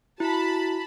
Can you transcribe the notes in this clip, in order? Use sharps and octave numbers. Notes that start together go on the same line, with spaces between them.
E4 F#4 A5 B5